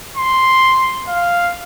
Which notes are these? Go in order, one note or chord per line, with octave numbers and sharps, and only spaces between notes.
C6
F5